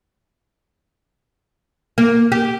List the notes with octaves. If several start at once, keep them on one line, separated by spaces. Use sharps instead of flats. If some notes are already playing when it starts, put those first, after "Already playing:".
A#3
G4